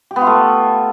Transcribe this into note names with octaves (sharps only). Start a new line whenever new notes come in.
G4
B3
F4
A3